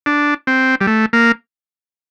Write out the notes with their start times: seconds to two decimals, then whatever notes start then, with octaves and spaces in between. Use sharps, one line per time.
0.06 D4
0.47 C4
0.81 G3
0.87 A3
1.13 A#3